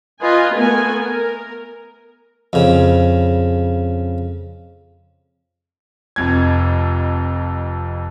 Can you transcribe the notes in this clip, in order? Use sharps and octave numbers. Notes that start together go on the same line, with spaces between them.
F4 B4 D#5 G#5
A3 B3 A#4 G#5
A#4
F2 C#3
F1 F2 G#6